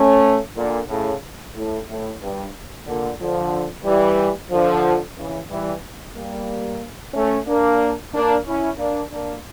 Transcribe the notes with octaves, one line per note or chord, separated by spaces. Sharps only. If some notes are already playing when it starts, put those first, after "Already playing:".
Already playing: A3 C#4
A#2 D3
A2 C#3
A2
A2
G2
A#2 D3
D3 F3
E3 G3
D3 F3
C#3 E3
E3 G3
G3 A#3
A3 C#4
A#3 D4
A#3 D4
C#4 E4
A#3 D4
A#3 D4